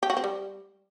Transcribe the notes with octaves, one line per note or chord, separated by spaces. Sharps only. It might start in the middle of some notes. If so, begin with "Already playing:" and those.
G4
F#4
C4
G3